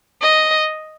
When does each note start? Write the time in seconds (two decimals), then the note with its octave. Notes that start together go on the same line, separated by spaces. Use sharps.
0.22 D#5